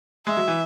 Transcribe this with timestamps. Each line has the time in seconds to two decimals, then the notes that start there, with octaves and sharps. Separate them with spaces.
0.27 G#3 E5
0.37 F#3
0.48 E3